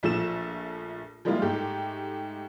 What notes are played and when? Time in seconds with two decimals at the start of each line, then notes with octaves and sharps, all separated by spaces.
0.03 A#1 F3 A3 E6 E7
1.25 F3 G3 G#3 A#3 E4 F4
1.42 G#2 A3 G4